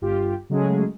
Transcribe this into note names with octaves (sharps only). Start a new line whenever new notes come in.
G1 F4 G4
C#3 F#3 G#3 A3 C#4 G#4